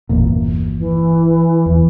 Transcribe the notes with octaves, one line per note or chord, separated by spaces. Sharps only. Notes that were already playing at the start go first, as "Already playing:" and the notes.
G1 E2 A#2
E3
E2